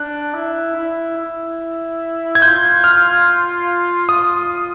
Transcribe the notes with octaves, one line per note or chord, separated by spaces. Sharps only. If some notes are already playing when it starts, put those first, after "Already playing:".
Already playing: D4 F#6
E4
E4
E4
G#6
F4 G6
F6
D#6